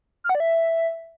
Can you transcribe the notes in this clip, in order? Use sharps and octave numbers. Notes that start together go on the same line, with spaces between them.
F6
F#5
D5
E5